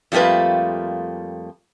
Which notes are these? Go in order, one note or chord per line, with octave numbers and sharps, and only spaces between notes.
F2 G3 A3 A#3 F4 B4